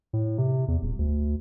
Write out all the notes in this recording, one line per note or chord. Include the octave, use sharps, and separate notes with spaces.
A2
C3
E2
D#1
D2